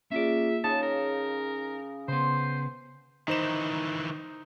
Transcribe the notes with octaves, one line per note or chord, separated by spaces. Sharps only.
A#3 C#4 F4 G#4 D5 E5
C#3 D#4 A5 D#6
A#4
C#3 B3 C5 C6
D#3 E3 D#4 C5 E7